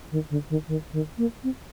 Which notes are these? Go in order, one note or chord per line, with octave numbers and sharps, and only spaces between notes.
D#3
D3
D#3
D#3
D#3
A#3
C4